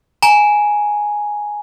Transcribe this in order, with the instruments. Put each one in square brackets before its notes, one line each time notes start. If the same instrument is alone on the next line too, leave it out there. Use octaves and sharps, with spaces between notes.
[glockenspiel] G#5 A#5